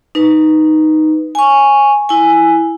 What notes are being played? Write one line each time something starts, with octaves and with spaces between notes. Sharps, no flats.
D#4 B4
G#5 C#6
E4 G#5